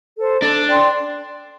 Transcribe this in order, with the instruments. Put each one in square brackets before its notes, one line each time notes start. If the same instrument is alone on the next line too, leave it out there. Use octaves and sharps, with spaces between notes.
[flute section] A4 C5
[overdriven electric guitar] D4 [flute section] A4
[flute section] D5 G5 C6